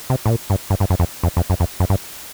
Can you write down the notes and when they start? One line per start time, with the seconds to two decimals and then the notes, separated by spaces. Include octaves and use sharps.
0.10 C3
0.26 A2
0.30 A#2
0.50 G2
0.70 G2
0.80 G2
0.90 F#2
1.00 F2
1.23 F2
1.37 F2
1.50 F#2
1.60 F2
1.80 F#2
1.90 G2